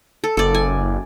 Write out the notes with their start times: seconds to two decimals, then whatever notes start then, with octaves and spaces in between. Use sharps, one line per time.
0.24 A4
0.37 F#1 A4 D5
0.54 G#5